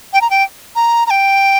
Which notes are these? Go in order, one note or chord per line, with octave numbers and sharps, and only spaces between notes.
G5
A#5
G5
A#5
A#5
G5